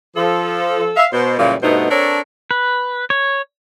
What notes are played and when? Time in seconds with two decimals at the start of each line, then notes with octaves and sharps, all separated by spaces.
0.16 F3 A4
0.97 E5 F5
1.12 B2 C5
1.38 F#2 A#2 C#3 E3 G3
1.62 G2 B2 A3 B3 D#4 C5
1.90 C4 D4 A4 A#4 C#5
2.51 B4
3.10 C#5